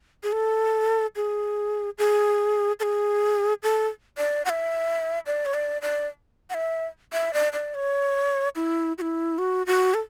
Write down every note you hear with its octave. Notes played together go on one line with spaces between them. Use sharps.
G#4
A4
G#4
G#4
A4
G#4
A4
D5
F#5
E5
D5
C#5
D5
D5
F#5
E5
E5
D5
D5
C#5
E4
F#4
E4
F#4
F#4
A4